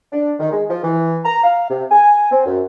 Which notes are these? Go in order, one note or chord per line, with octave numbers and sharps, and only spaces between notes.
D4
D#3
G#3
F3
E3
A#5
F5
C3
G#5
C4
F#2